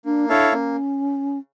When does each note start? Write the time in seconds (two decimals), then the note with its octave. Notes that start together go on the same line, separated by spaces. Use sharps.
0.05 A#3 D4
0.29 D4 E4 A4 C#5 F5
0.53 A#3 C#4